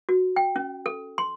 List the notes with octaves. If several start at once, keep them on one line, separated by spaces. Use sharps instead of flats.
F#4
G5
C#4
A4
C6